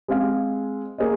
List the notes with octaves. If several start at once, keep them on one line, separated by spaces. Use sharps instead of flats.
G#3 C4 G#4 F5
A#3 G#4 C5 D#5